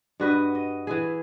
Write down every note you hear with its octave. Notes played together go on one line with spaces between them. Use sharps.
G2 F#4 B4 D#5
D#5
E3 E4 G#4